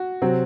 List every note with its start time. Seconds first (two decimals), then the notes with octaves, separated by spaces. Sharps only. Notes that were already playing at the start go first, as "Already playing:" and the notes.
Already playing: F#4
0.22 C3 F#3 C4